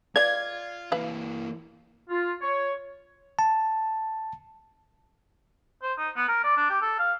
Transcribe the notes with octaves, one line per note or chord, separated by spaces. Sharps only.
F4 B4 D5 D#5 F5 G#6
E3 A#3 E4 B4 F5
F4
C#5
A5
C5
D#4
B3
A#4
D5
D4
G4
A4
F5